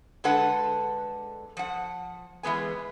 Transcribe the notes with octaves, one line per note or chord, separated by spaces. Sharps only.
D3 G#3 D4 A4 B4 F#5
F3 F#5
E3 G#3 B3 G#5